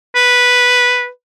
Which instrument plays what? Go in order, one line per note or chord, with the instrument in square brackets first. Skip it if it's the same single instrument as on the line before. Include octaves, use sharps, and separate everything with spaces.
[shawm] B4